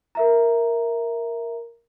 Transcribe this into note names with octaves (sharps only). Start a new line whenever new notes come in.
A#4 E5 A#5